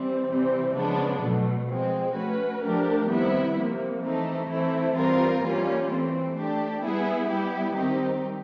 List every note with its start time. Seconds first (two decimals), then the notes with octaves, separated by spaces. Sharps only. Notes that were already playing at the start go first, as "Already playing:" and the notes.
Already playing: E3 G3 C4
0.29 C3 E3 G3 C4
0.76 C#3 F3 G#3 B3 D4
1.23 B2 F#3 A3
1.69 F3 G#3 C4
2.15 A3 C#4 F#4 B4
2.63 F3 A3 D4 G4 A#4
3.09 C3 D#3 G3 B3 E4
3.55 C3 F3 A#3
4.02 E3 A3 C4 D#4
4.48 E3 A3 C4 E4
4.95 E3 G3 C4 F4 A#4
5.42 E3 G3 A#3 C#4 F4
5.88 E3 A3 C4
6.35 A3 D4 G4
6.83 G3 B3 E4 G#4
7.29 G3 B3 E4 G4
7.75 D#3 G3 C4 D#4 G4